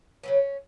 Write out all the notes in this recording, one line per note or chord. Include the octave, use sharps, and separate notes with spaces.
C#3 F#3 B3 C#4